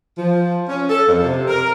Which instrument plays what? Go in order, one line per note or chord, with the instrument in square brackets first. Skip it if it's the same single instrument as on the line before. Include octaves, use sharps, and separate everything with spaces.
[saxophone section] F3
C#4
A4
F2
C3
A#4